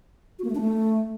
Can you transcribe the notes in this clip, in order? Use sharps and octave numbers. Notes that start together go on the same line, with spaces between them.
F#4
A#3
A3
D4
A3